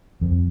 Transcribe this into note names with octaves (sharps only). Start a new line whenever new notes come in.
F2